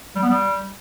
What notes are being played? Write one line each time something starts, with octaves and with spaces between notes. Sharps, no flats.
G3
B3
G3